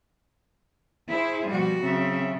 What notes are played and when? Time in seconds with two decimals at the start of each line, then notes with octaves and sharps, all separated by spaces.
1.09 E4 G#4 C5
1.50 B2 F3 G3 F#4
1.83 C#3 F#3 C4 E5